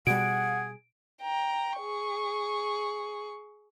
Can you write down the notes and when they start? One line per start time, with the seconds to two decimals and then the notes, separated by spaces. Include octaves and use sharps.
0.07 B2 G3 G#4 F#5 D7
1.21 G5 A#5
1.79 G#4 C#6